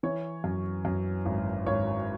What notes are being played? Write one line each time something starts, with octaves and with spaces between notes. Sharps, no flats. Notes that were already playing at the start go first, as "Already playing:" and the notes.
E3 C#5
F#2
F#2
G#1
G#1 C#5